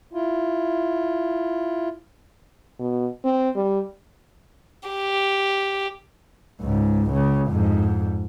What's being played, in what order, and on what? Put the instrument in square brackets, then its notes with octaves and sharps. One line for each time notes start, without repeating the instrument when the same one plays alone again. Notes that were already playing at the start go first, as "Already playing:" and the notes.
[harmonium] E4 F4
[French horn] B2
C4
G3
[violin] G4
[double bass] C#2 G#2
C#2 C#3
F2 G#2